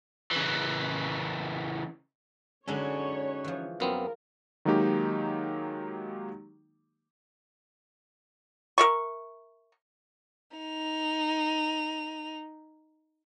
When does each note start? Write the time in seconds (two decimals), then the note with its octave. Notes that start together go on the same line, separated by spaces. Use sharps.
0.31 C#3 E3
2.68 D3 G#3 C#4 D#4 F#4 A4 C#5
3.44 E3 F3
3.80 F#2 B3 C4 F4 A#4
4.65 D#3 F#3 G#3 A#3 D#4 G4
8.78 A#4 E5 C#6
10.57 D#4 F7